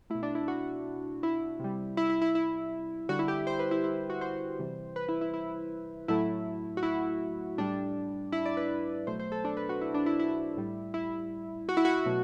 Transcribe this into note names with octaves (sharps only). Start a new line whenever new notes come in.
B2 A3 E4
D4
E4
F#4
E4
C3 G3
E4
E4
E4
E4
D3 G3 F#4
E4
G4
C5
B4
E4
E4
F#4
C5
C3 E3 G3
B4
E4
E4
E4
A2 F#3 A3 E4
F#4
E4
A2 G3 D4
E4
D5
B4
B2 F#3 A3 C5
C5
A4
D4
B4
F#4
E4
D4
E4
E4
A2 G3
E4
F#4
E4
F#4
B2 F#3 A3